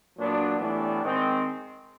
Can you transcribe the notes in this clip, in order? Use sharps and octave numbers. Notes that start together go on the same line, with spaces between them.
A#2 F#3 B3 D4
A2 E3 G3 B3 D4
D#3 G#3 C4